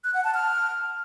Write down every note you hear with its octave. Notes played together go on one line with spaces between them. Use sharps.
F#6
F#5
A5
F6